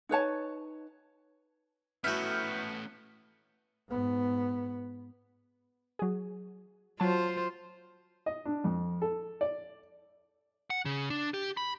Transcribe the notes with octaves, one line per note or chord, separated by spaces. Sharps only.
D#4 B4 C#5 A5
A2 A3 B3 C#4 E4 F#4 F6 G6
G#2 B3
F#3 G#4
F#3 F4 C5 A5
D#5
D4
F2
A4
D5
F#5
C#3
D4
G4
B5